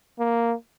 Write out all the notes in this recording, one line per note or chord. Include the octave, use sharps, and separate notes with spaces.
A#3